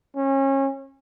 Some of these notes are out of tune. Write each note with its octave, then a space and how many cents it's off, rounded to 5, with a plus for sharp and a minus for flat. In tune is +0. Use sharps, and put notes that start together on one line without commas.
C#4 -30